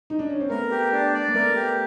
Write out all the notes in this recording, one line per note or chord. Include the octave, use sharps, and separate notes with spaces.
D#4
D4
C#4
C4
A3 B3 A#4
G4
D4
D5
A#3
A3 B3 A#4
G4